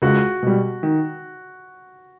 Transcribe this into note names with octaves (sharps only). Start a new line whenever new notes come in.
C#2 F#4
B2 G3
D#3